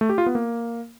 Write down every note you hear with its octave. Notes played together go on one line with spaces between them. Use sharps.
A3
G4
F4
B3
A#3